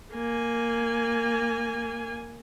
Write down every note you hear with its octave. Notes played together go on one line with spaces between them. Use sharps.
A#3 G#5